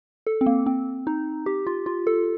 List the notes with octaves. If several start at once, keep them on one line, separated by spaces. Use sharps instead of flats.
A4
C4
A#3
C4
D#4
G4
F4
F4
A4